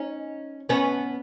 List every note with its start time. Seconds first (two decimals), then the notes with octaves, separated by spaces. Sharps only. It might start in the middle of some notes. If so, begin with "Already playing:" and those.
Already playing: C#4 D#4
0.69 B3 C#4